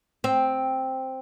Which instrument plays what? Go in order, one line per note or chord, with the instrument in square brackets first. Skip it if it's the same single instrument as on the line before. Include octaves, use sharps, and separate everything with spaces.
[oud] C4